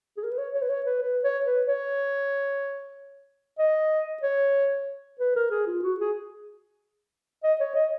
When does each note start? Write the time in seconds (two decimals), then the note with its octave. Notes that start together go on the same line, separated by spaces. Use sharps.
0.17 G#4
0.23 A#4
0.31 B4
0.38 C#5
0.55 C#5
0.62 B4
0.70 C#5
0.86 B4
1.02 B4
1.24 C#5
1.46 B4
1.66 C#5
3.59 D#5
4.23 C#5
5.20 B4
5.36 A#4
5.51 G#4
5.67 F4
5.83 F#4
6.00 G#4
7.44 D#5
7.60 C#5
7.75 D#5